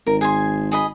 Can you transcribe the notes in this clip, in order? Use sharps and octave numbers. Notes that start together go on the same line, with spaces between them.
G#1 A#4
G#4 G#5 C6
G#4 D#5 B5